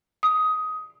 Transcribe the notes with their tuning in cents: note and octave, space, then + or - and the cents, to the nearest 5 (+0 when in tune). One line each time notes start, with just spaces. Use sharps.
D#6 +15